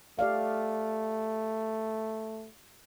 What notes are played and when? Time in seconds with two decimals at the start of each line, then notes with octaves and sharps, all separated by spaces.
0.19 A3 G4 D5 F5